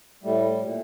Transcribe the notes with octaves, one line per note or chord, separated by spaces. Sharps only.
A2 G3 A3
A#2 A3